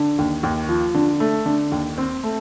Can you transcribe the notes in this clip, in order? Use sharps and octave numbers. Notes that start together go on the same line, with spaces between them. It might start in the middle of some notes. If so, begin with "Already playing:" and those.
Already playing: D3
D#2
D#2
F3
D3
A3
D3
D#2
C4
A3